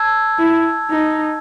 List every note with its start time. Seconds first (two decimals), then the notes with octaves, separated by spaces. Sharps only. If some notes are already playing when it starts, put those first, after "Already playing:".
Already playing: A5 E6 G#6
0.38 E4
0.91 D#4